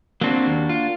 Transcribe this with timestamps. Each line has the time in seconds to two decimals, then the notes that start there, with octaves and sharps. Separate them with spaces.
0.21 F#3 A#3 C4 D4 F#4
0.46 D#2
0.69 F4